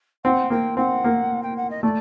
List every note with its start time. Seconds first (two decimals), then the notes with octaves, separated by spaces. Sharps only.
0.24 C4 F#5
0.50 A#3 G5
0.77 C4 F#5
1.04 A#3
1.43 G5
1.57 F#5
1.70 D#5
1.83 A3 D5